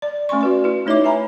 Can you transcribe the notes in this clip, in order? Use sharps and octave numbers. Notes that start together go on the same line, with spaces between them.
D5
A3 C#4 G#5 C6 C#6
F#4 B4 D5
E4 B4
A3 D#4 C#5 D#5 E5 D6
B4 E5 G#5 A#5 B5